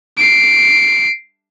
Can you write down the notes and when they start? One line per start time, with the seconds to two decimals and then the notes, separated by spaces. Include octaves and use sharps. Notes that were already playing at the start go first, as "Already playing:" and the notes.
0.18 C7 D7